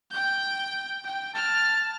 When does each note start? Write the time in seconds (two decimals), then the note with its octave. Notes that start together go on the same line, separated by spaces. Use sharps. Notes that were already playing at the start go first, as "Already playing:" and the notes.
0.10 G5 G6
1.04 G5
1.35 A5 F6